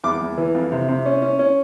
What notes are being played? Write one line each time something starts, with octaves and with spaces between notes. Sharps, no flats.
E2 D6
E2
E3
F2
C3
C3
C#4
C#4
C#4